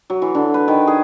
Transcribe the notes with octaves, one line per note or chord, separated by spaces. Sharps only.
F#3
E3
D3
B4
D#3
G#4